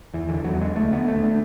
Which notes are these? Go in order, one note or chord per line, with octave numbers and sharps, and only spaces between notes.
E2 E3
D3 E3
E2 F#3
D3 G#3
D2 A3
D3 B3
D2 A3
D3